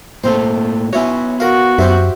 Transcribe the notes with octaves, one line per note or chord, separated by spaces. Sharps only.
A2 A#3 C4 A4 C5
B3 C#4 E4 F#4 C#5
F#4 A#4 F5
F#2 G4 C5 E5